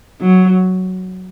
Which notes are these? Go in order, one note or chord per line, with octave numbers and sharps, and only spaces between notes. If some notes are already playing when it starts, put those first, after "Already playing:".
F#3